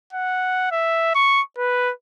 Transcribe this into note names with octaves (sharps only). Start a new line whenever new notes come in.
F#5
E5
C#6
B4